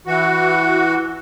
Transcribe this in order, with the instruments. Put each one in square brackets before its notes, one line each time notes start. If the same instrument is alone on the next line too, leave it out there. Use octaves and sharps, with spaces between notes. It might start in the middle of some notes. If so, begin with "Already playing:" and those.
[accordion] E3 F#4